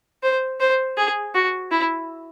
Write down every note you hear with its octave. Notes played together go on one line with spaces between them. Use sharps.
C5
C5
G#4
F#4
E4